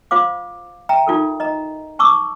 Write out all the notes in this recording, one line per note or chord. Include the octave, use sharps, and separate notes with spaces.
F4 C5 F5 D6
E5 G5 A#5
D#4 F4 A4 A#4
D#5 A#5
A5 C#6 D6 E6